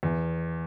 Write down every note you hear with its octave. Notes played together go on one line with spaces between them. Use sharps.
E2